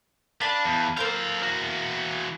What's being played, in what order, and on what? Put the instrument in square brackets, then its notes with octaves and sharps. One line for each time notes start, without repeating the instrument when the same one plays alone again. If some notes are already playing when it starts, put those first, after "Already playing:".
[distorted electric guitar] D4 [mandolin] B4 F5 A5
[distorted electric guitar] E2
[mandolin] A#3 C5 G6 [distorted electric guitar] A4 F5
[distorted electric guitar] E3 F#4